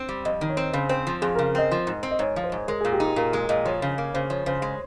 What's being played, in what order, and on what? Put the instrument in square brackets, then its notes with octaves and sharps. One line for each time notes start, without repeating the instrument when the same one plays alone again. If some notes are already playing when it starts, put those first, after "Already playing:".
Already playing: [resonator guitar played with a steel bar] C4
G3
[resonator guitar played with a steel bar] F2 [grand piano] D#5
[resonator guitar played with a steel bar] D#3
[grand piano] C#5
[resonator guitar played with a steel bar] C4
[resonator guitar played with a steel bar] C#3 [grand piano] C5
[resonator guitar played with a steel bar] C4 [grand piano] C5
[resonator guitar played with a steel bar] F3
[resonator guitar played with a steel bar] F2 [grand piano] G#4
[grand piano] A#4
[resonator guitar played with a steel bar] C#3
[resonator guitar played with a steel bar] C4 [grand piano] D#5
[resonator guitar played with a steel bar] F3
G#2
C4
[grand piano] D#5
[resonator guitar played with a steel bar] G#2 [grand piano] C#5
[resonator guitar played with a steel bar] F3
[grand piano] C5
[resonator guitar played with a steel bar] G#2
[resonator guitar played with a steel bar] G#3 [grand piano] A#4
[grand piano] G#4
[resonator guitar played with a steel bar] A#2
[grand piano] G4
[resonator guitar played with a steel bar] D#4
[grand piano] G#4
[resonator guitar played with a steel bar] A#2 [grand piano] A#4
[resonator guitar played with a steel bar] G#3 [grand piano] G#4
[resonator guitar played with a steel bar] A#2 [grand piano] D#5
[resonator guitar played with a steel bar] F3 [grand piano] C#5
[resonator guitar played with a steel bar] C#3
A#3
[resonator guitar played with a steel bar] C#3 [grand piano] C5
[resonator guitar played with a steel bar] F3 [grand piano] C#5
[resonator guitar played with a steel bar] C#3 [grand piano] C5
[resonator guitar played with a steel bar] G#3